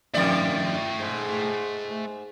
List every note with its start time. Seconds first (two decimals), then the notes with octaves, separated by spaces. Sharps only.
0.14 F2 D#3 A3 D5 G5
1.00 G#2